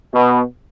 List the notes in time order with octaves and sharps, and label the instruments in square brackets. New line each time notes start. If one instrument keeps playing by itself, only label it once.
[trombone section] B2